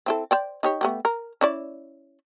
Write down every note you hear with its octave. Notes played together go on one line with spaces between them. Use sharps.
C4 E4 A4
C5 D5 G5
D#4 G4 C#5
A3 B3 G4
A#4
C#4 E4 D5